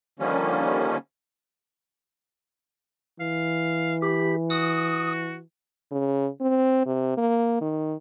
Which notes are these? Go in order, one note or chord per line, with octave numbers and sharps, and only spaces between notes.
D3 D#3 F3 G3 A#3 C#4
E3 F5
G4 B5
F#4 D#6
C#3
C4
C3
A#3
D#3